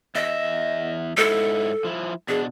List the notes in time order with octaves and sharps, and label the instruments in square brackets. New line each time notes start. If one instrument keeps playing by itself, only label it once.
[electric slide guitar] E2 E5 [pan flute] D#5
[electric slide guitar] G#2 E4 [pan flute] A4
[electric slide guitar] F3 E4
[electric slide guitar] B2 D4 [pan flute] G#4